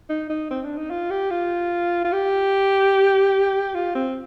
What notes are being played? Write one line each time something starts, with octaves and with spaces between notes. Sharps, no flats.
D#4
D#4
C4
D4
D#4
F4
G4
F4
F4
G4
F4
C4